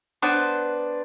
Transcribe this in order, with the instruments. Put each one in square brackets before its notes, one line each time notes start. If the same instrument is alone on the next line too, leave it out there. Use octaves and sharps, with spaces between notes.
[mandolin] B3 D4 B4 C5